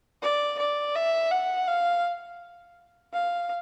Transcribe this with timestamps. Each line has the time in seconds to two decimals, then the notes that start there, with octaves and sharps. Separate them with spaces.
0.22 D5
0.59 D5
0.95 E5
1.31 F#5
1.67 F5
3.13 F5